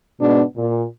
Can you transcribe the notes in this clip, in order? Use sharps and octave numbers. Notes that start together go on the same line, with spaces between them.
G#2 B2 B3 D4
A#2